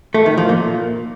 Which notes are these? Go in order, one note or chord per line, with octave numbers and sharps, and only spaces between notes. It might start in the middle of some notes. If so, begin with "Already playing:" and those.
A3
D#3
F3
A#2